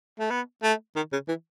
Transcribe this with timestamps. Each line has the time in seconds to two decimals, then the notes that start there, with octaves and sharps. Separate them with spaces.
0.20 A3
0.31 B3
0.63 A3
0.96 D#3
1.13 C#3
1.28 E3